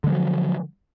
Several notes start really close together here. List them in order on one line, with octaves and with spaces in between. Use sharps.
D3 G#3 F3 F#3